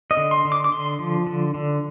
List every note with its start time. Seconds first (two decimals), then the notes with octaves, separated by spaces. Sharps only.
0.11 D#5
0.17 D3
0.31 C6
0.45 D3
0.52 D6
0.64 D6
0.71 D3 C6
0.99 F3
1.27 D3
1.54 D3